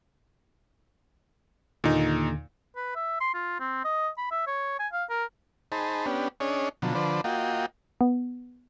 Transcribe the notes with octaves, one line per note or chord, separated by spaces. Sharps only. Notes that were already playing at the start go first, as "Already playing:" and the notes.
D#2 A#2 D3 D#4
B4
E5
C6
F4
C4
D#5
B5
E5
C#5
G#5
F5
A#4
D#4 G#4 C5 A5 B5
B3 C#4 D4 G4
C#4 D4 G#4 C#5 D#5
B2 D3 F3 F#3
D3 F3 B4 C5 D5
A#3 F4 F#4 D#5 G5
B3